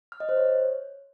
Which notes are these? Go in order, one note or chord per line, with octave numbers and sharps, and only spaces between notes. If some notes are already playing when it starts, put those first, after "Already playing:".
F6
D#5
C5
C#5